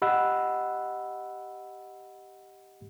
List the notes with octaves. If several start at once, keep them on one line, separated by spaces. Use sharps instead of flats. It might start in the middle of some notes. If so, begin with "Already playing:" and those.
G4 D#5 F#5 B5 E6 F#6